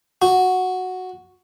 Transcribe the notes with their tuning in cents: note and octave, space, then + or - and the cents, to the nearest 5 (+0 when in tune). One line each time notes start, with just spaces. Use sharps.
F#4 -5